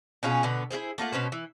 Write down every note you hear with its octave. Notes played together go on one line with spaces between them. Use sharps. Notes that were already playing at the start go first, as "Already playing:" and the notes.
B2 C#4 F4 G#4
B2 D3 B3
E4 F4 G#4 C5
A3 A#3 F4 F#5
B2 C#4 B4 C5
E3